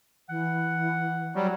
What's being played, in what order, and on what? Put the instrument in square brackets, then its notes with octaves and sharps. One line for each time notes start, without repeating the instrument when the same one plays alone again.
[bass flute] E3 [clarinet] F#5
[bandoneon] F#3 G3 [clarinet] F#4